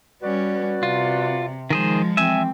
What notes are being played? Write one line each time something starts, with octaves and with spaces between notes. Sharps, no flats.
G3 C#4 F#4 B4 D5
C3 F4
D#3 F3 G#3 G#4 C5
E3 C4 E5 G#5